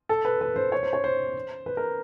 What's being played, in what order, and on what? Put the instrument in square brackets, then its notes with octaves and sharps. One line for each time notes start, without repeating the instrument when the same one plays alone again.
[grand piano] A4
B4
B4
C5
C#5
C5
C#5
C5
B4
A#4